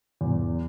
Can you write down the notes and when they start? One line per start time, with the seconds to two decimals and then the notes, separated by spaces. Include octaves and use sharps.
0.21 E2